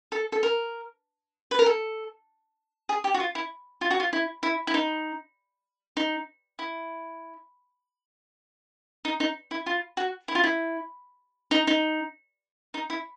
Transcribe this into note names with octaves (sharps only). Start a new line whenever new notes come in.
A4
A4
A#4
B4
A#4
A4
G#4
G4
F#4
F4
E4
F4
F#4
F4
E4
E4
E4
D#4
D#4
E4
D#4
D#4
E4
F4
F#4
E4
F4
E4
D#4
D#4
D#4
E4